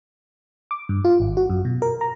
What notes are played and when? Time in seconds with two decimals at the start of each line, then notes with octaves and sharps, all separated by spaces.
0.71 D6
0.89 G2
1.05 F4
1.20 G#1
1.37 F#4
1.50 F#2
1.65 B2
1.82 A#4
2.01 A#5